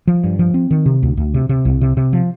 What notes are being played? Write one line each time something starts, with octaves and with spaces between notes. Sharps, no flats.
F3
G2
F3
C4
D#3
C3
D2
D2
C3
C3
C2
C3
C3
F3